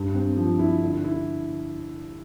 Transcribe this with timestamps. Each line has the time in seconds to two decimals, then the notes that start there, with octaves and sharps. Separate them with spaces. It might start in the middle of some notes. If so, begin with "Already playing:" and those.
Already playing: G2
0.15 C4
0.37 F3
0.59 E4
0.82 D3
1.04 E4